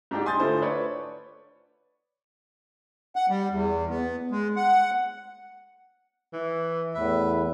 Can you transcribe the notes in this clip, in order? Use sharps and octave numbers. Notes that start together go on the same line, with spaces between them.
G#2 D4 G4
G#5 C6 D#6 G6 A6
D3 A3 E4 F4 C5
B4 C#5 D5
F#5
G3
E2
B3
G#3
F#5
E3
E2 A2 B4 E5